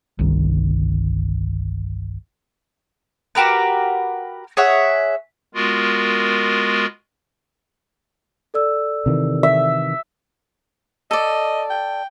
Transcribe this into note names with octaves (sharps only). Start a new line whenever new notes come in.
G1 C2 D#3
F#4 G4 A#4 B4
G#4 C#5 E5 F#5
G#3 B3 F4 F#4 A#4
A4 D5 E6
C3 D#3 E3
E5
A4 D5 D#5
G5